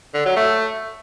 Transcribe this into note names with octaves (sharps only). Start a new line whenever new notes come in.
D3
F#3
A3